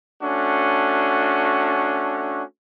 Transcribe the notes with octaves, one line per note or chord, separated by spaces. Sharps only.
A3 C#4 D4 F#4